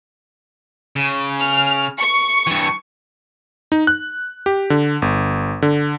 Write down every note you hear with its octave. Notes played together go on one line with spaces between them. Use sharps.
C#3
F6
C#6
G2 E3
D#4
F#6
G4
D3
G1
D3